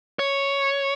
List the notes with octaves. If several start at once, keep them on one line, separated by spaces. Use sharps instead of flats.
C#5